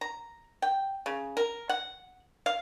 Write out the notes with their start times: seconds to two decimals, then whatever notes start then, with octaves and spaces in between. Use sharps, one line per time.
0.01 A#5
0.62 G5
1.06 C#3
1.37 A#4
1.69 F#5
2.46 F5